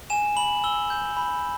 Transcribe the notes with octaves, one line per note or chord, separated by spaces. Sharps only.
G#5 E7
B5 F#7
E6 G7
G6
B5